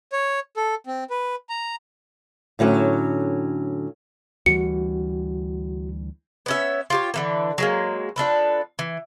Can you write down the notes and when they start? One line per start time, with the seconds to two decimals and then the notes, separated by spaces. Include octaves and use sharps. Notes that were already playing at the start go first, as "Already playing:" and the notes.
0.12 C#5
0.57 A4
0.87 C4
1.10 B4
1.49 A#5
2.59 A2 D3 F#3 C#4
4.46 D2 E3 G3 F#4 C#7
6.46 B3 C#4 E5
6.90 F4 G4 C#5
7.14 D3 E3 A#3
7.58 F#3 G#3 A#3
8.16 F3 D4 A4 B4
8.79 E3